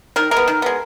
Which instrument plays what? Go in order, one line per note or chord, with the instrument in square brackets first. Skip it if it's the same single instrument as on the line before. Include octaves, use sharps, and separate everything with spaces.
[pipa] D#3 A#4
G#3 A#4
B3
D#3
G#3 B3